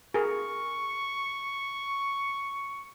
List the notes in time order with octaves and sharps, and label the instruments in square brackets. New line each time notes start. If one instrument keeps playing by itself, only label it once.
[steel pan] G#4 A#4 [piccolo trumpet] C#6